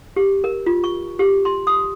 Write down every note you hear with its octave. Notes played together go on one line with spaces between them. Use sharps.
G4
A#4
F4
C#6
G4
C6
D#6